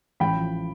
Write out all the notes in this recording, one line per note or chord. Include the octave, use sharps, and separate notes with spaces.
A1 G5 B5
F3